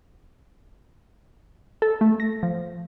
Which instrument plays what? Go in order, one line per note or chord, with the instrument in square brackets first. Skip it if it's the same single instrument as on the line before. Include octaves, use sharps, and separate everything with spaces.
[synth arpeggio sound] A4
A3
A#6
F3